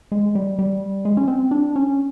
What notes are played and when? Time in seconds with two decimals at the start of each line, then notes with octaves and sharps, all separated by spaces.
0.12 G#3
0.35 G3
0.59 G3
1.05 G#3
1.17 C#4
1.28 C4
1.51 D4
1.76 C#4